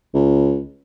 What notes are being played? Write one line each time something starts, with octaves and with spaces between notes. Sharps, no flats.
C#2